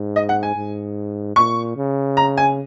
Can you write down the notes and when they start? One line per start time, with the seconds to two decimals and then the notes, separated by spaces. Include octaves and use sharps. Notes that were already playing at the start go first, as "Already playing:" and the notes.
Already playing: G#2
0.16 D#5
0.29 F#5
0.43 G#5
0.56 G#2
1.36 A#2 C#6
1.76 C#3
2.17 A#5
2.38 G#5